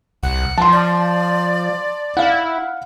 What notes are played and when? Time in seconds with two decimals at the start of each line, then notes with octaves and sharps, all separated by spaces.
0.23 C2 F#5
0.58 F3 A5 C6
0.72 D5
2.17 E4 F5 F#5